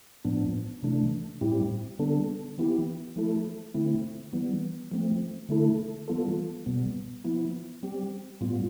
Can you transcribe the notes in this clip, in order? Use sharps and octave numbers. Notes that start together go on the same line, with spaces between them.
A2 F3 B3 D4
C3 E3 A3 D4
A2 G3 C4 E4 G4
D3 G3 B3 D4 A4
E3 B3 E4 G4
F3 A3 E4 A4
D3 A3 C4 E4
E3 G3 B3
F3 A3 C4
D3 A3 E4 A4
E3 G3 B3 F4 A4
B2 G3 B3
F3 B3 E4
G3 C4 G4
A2 G3 B3 F4